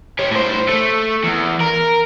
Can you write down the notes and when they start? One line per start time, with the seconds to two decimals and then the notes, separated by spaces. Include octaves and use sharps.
0.19 C#4 G4
0.31 A2 C5
0.68 A3
1.24 E2
1.61 A#4